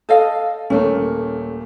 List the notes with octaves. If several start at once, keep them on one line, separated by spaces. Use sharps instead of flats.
A4 D#5 F5
D#1 A3 A#3 C#4